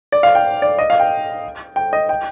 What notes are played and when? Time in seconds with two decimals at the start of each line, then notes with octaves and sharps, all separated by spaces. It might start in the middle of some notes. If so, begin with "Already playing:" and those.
0.12 D5
0.23 F5
0.35 G5
0.62 D5
0.79 D#5
0.90 F5
1.00 G5
1.76 G5
1.93 D#5
2.09 G5